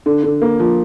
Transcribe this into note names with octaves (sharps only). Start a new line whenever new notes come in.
D3
D3
A#3
F3